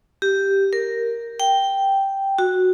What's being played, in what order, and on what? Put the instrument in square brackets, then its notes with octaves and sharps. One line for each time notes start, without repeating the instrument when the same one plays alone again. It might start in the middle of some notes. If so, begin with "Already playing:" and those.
[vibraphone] G4
A#4
G5
F#4